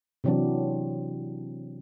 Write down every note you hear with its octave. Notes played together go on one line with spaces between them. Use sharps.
C3 E3 F#3 C4 D4